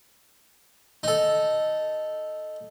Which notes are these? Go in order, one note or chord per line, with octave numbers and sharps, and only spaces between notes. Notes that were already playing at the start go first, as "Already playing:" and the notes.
D#4 A4